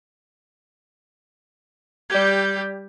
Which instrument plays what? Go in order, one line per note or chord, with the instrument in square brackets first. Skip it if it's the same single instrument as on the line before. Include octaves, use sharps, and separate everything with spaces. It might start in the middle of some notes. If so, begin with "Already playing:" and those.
[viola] G3 G4 [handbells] D5 G#6